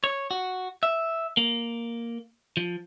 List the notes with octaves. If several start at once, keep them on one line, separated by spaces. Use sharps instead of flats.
C#5
F#4
E5
A#3
F3